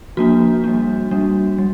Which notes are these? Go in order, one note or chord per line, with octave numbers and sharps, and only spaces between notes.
F3 A#3 D4 F#4
G3 A#3 D4
G3 A#3 D4
G3